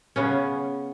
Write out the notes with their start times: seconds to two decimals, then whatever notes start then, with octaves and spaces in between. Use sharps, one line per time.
0.16 C#3 B3 C#4